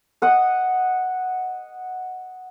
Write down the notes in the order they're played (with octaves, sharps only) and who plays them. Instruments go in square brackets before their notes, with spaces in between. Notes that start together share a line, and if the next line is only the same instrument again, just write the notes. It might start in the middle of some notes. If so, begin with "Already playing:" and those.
[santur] D#5 F#5 D#6